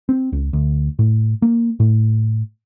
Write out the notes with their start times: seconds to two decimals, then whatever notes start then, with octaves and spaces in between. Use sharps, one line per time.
0.09 C4
0.32 C#2
0.53 D2
0.99 A2
1.42 A#3
1.80 A2